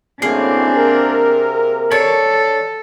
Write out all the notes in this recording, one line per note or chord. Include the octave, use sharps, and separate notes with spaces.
F#2 A2 A#3 C4 D4 G#4
C3 A#4
D4 A4 C#5